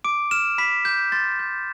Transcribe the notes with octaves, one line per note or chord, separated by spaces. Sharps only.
D6 D7
F6 E7
B5 B6
D6 G6
C6 A6
G6